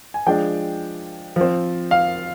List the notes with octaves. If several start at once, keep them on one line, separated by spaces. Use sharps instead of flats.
G#5
F3 G#3 D4 G5
F3 C4
F5